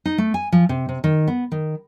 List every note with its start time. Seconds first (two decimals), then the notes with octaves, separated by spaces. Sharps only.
0.05 D#4
0.18 A3
0.34 G#5
0.52 F3
0.69 C3
0.89 C3
1.04 D#3
1.28 B3
1.52 D#3